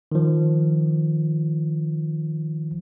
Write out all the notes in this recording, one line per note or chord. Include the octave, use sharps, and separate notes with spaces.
D#3 F3